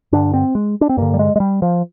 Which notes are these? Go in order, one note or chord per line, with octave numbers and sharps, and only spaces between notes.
G2 D3 D4
C4
G#3
D4
C4
G2 D3 A#3
G3
G#3
G#3
G3
F3